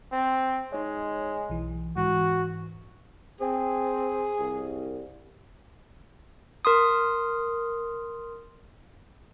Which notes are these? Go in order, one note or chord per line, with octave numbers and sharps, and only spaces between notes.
C4
G#3 D#4 C#5
B1 E3
G#2 E3 F#4
C4 G#4
C2
A#4 C6 D#6